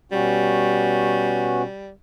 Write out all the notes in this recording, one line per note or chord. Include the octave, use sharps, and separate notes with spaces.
B2 G3 C#4 F#4